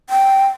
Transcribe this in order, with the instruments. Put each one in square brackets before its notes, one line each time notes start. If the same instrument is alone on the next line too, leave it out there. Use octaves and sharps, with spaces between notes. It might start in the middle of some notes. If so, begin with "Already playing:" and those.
[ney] G5